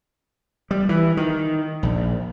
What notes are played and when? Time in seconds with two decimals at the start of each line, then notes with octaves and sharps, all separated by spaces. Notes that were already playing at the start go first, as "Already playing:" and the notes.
0.71 G3
0.89 E3
1.17 D#3
1.83 A#1